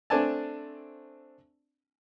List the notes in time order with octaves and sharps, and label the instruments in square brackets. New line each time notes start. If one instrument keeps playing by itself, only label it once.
[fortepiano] A3 C4 D4 D5 G#5 A5